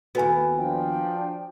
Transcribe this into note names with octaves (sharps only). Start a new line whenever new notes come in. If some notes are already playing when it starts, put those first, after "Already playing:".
D#2 B3 F#4 B4 G#5
F3 D4 G5